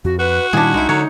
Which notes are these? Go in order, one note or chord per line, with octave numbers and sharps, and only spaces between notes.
F2 F#4
F#4 B4
A#2 D#3 G3 D4 E4 G#4
C2 G#3 D#4 E4
D3 F#3 C#5